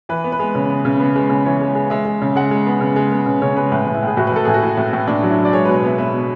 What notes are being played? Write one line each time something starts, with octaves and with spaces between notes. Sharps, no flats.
E3 B4
B3
B4
G#3
C#3
B3
C#3
B3
G#3
C#3
E3 C#5
G#3
G#3
G#3 E5
G#3
C#3
G#3 F#5
G#3
B3
C#3
G#3
B3
C#3
C#3 C#5
G#3 B4
A2 B4
A2
E4
A2 G#4
A2 F#4
B4
A2 A4
A2 G#4
F#4
A2 E4
A2
A2
A2 D4
F#3
E4
F#3
D5
G#3 C#5
B2 B4
C#5
B3 E5
B3 E5
B2